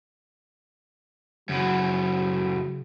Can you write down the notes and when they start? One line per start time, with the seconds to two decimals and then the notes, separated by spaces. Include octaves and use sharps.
1.49 F#2 C#3 E3 F#3